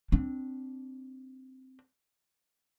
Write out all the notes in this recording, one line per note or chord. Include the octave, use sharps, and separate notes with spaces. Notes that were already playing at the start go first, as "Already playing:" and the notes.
C4 D4